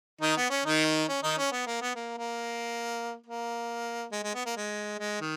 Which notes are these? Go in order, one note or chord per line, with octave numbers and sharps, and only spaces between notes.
D#3 D#4
B3
C#4
D#3 D#4
C#4
D#3 D#4
C#4
B3
A#3
B3
A#3
A#3
A#3
G#3
G#3
B3
A#3
G#3
G#3
D#3